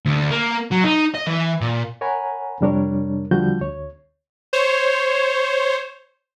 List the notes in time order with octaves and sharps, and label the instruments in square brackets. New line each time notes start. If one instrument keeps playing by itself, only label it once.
[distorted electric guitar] D2
A#3
F#3
D#4
D#5
E3
A#2
[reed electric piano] A#4 C#5 F#5 G#5 A#5 B5
F2 C3 G3 D4 A#4 C#5
E2 D3 F3 G3 F#4 G6
D2 C#5
[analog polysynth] C5 C#5